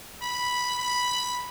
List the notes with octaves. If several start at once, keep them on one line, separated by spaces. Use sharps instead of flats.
B5
B5